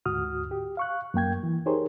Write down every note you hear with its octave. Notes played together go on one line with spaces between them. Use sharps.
D2 G#2 F#4 D#6 F6
G4
F5 C#6 F#6
F#2 A#3 G5 G#6
E3
D#4 G4 G#4 A#4 C5 C#5